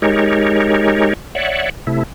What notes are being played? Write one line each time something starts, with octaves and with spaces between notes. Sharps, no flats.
G#3 D#4 G4 A#4 C#5
C#5 D5 E5 F#5
C3 A3 E4